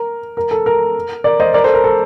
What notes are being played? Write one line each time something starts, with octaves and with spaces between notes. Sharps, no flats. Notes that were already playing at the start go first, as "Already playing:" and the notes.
Already playing: A#4
A#4
A4
A#4
A#4 D5
C5 D#5
A#4 D5
A4 C5
A#4
A4